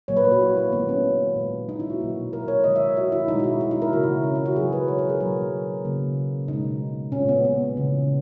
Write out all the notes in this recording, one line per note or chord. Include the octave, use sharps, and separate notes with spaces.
A#2 F#3 A#3 C#5
B4
C#5
F#4
E4
A#3
D#3 G#3 B3
C#4
A#2 G#3
D#4
E4
F#4
B2 F#3 A#3
A#4
C#5
D#3 G#3 D#5
E5
F#4
E4
B2 G#3 D#4
F#4
E4
D#4
E4
A#4
C#3 E3 A#3 F#4
E4
C#4
E4
F#4
C#3 F#3 A#3 G#4
B4
C#5
A#4
G#4
B2 F#3 A#3 A#4
C#3 F#3 A#3
B2 G#3 D#4
A#2 G#3 C#4
B3
B3
C#3 E3 G#3